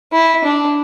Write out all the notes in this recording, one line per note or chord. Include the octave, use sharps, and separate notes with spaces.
E4
D4